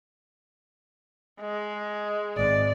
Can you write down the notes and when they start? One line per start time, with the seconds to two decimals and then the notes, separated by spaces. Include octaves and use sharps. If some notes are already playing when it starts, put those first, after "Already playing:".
1.41 G#3
2.36 G#1 D5